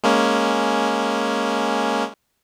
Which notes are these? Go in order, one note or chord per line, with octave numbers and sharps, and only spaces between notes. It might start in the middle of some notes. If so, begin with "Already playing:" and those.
G#3 A#3 C#4